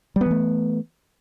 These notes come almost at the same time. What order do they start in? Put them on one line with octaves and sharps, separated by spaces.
G3 B3 E3 A3